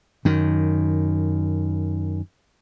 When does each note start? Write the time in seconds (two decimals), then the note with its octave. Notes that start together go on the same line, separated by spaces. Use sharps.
0.25 F#2 D#3